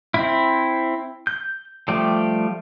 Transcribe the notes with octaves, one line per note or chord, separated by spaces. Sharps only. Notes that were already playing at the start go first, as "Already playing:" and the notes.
C4 E4
G6
F3 G3 A3 G4